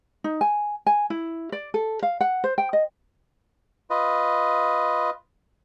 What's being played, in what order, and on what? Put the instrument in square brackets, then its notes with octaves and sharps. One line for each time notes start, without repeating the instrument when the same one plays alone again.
[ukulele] D#4
G#5
G#5
E4
D5
A4
F5
F#5
C5
G5
D#5
[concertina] F4 B4 D#5